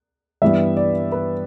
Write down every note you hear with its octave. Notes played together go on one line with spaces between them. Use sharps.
G2 E3 G3 B3 E5
D5
B4